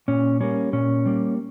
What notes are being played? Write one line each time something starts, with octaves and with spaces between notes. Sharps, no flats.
A#2 C#4
G3 A#3 C#4
A#2 C#4
G3 A#3